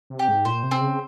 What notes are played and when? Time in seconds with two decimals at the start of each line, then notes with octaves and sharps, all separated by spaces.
0.10 C3
0.19 G4
0.28 G#2
0.45 A#2 C5
0.63 C3
0.71 C4
0.81 C#3